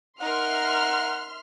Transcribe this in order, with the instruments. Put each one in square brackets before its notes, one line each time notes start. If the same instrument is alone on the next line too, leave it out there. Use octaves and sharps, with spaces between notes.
[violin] D#4 A#4 [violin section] E5 C6 F6 [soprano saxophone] F#5